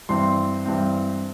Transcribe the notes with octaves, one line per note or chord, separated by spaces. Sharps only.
G2 E3 C4 C6
G2 E3 C4